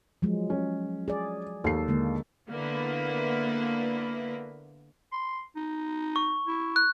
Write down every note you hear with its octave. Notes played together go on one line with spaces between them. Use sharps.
F3 F#3 G#3
C#4
G#4 D5
D#2 A4 C7
D3 G#3 A#3
D3 A#3 B3 E4 B4
C6
D#4
C#6
E4
F#6